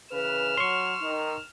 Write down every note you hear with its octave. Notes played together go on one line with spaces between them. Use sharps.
C#3 E3 B4 F6 E7
F#3 C#5 C6 C#6
D#3 D#4